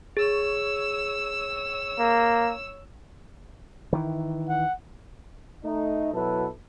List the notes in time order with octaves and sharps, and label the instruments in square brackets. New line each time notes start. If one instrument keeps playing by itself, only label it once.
[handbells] G#4 [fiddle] C#5 E6
[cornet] A#3
[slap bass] D#3 E3
[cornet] F#5
[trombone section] A3 D#4
B2 F#3 E4 A4 B4